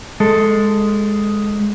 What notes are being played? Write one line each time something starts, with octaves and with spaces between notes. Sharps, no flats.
G#3 A4